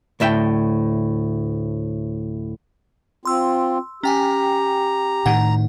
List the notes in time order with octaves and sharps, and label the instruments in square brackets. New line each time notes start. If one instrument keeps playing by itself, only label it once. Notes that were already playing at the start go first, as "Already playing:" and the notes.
[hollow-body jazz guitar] D2 A2 E5 G5
[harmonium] C4 F4 [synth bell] C6 E6
[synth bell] C#4 G5 G#5 [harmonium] G4 [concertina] A#5
[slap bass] A2 D#3 [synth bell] F#5